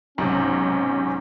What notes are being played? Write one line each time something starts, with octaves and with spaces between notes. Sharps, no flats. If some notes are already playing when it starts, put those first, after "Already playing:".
B1 G#2 C3 C#4